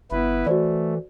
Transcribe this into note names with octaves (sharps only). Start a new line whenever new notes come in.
G1 B3 E4 B4
E3 A3 F#4 C5 D5